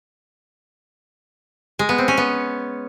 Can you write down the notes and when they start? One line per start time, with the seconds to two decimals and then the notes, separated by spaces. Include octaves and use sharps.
1.79 G#3
1.89 B3
1.98 C4
2.08 C#4
2.17 B3